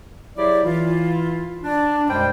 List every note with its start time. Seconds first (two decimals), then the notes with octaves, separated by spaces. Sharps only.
0.37 F#3 E4 G4 G#4 D5
0.65 E3 E4 F4
1.64 D4
2.09 F#2 B2 G3 G#3 C5 G5